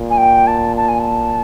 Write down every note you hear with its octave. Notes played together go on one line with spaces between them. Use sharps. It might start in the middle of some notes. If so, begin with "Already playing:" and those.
Already playing: A#2
G#5
G5
A5
A5
G#5
A5